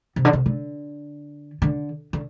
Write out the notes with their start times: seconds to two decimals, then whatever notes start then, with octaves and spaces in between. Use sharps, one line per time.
0.16 C3
0.25 D3
0.33 C3
0.46 D3
1.62 D3
2.13 D3